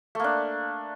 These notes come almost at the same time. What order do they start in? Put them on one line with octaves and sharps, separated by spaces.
A3 A#3 D4